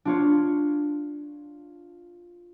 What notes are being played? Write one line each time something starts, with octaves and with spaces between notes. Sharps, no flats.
D4 F4 C#5